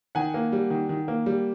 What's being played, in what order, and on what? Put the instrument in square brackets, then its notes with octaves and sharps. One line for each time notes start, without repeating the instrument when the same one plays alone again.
[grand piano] D#3 F#5 G#5
A#3
G3
D#3
D#3
A#3
G3